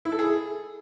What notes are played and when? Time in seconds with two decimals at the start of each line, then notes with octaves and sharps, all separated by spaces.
0.05 E4
0.12 A4
0.19 G#4